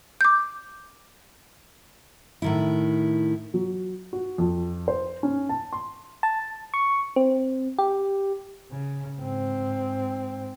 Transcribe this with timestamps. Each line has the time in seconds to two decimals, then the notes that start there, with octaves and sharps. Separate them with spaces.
0.21 D6 G6
2.42 A2 D#3 E4
3.54 F#3
4.13 F#4
4.38 F2
4.88 C5
5.23 C#4
5.49 A5
5.73 C6
6.23 A5
6.74 C#6
7.16 C4
7.79 G4
8.71 C#3
9.18 G#2 C4